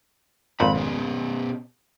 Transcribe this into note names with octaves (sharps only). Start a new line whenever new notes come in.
G#1 F2 A#2 B5
B2 C#4